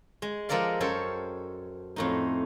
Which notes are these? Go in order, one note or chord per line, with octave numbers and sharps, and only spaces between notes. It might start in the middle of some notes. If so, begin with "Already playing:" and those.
G#3
F3 G#3 A4 A#4 D5 F5
F#2 A4 C5 C#5 G5
F2 A2 D#4